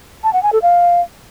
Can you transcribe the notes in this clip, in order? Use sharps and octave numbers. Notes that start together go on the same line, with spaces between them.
A5
F#5
G#5
A4
F5